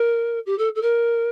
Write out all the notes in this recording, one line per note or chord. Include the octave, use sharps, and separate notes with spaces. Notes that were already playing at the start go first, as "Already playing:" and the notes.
Already playing: A#4
G4
A4
A4
A#4